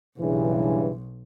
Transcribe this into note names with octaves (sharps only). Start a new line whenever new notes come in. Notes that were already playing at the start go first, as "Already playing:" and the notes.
B1 G2 C#3 E3